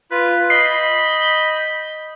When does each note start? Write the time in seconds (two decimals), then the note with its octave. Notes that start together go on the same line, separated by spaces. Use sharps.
0.11 F4 B4
0.50 D#5 B5 G6 C7